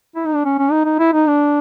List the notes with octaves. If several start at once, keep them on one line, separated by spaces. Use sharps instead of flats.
E4
D#4
D4
C#4
C#4
D#4
D#4
E4
D#4
D4